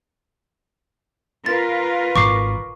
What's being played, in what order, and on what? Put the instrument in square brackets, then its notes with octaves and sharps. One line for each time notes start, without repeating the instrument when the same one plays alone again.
[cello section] F4 A#4 B4 [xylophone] A6
[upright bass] G#1 [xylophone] C#6 D6 C7